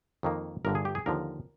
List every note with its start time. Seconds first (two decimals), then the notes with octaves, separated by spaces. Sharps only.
0.23 F2 D#3 A#3
0.65 G1 G2 D3 A#4
0.75 G#4
0.85 G4
0.95 G#4
1.06 D#2 D3 F3 A#4